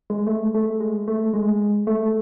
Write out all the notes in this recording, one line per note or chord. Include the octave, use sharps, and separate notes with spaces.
G#3
A3
A3
G#3
A3
G#3
A3